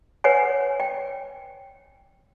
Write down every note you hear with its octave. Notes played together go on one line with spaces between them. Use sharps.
B4 C#5 F#5 G#5
G5